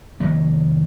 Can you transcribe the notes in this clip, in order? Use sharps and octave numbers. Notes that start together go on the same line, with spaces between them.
F1 D#3 A3 A#3